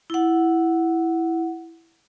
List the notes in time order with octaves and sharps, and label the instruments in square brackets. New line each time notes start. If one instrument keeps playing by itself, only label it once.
[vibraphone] E4 F#5